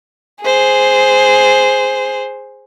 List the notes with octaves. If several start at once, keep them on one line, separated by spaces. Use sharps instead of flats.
G#4 C5